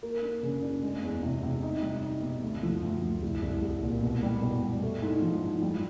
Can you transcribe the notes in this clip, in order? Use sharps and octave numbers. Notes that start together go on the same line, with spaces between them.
A#3
D4
C#3
D4
G#3
E2
C3
C3
D#4
G3
D#4
B2
D2
F3
D2
D2
C2
C2
C2
A#2
B2
G3
B2
G3
A3
G#2
F3
G#2
G3